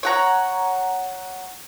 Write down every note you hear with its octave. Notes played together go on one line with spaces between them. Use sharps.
C#5 F#5 A#5